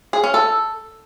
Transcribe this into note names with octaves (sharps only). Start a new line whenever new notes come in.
G#4
C#4
A4